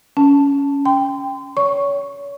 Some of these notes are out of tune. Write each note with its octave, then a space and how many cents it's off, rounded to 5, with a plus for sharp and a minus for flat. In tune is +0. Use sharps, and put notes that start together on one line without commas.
C#4 +15 A5 +0
G5 +5 C6 -30
C#5 +30 C#6 +0